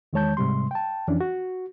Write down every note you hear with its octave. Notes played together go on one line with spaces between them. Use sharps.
E2 D#3 G#3 C#5 A5 G6
G#2 C3 G3 C6
G5 A5
F2 E3 C#4 D4
F#4